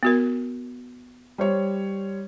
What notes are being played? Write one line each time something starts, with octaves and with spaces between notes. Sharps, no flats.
B3 F#4 A#4
G3 C5 C#5